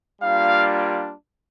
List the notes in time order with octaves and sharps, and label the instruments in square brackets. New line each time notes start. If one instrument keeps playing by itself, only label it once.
[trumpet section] G3 A#3 D4 F4 F5